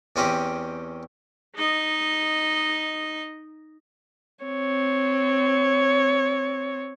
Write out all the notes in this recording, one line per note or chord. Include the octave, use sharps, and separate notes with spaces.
E2 C4 C#4 G4 D#5 B5
D#4 D#5
C4 C#5